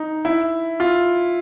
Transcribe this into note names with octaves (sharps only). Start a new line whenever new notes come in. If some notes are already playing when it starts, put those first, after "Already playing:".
Already playing: D#4
E4
F4